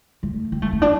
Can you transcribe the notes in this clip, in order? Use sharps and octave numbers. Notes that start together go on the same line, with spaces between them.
A3
C4
A3
C4
D4